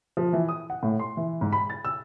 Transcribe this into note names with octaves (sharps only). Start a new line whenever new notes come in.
F3
E3
D#6
F#5
A2
C6
E3
G#2
B5
A6
E6